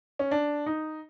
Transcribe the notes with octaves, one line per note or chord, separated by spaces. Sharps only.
C#4
D4
D#4